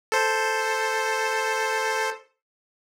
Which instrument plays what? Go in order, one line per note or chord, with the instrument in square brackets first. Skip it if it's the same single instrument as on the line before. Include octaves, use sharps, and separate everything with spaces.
[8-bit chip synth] A4 C5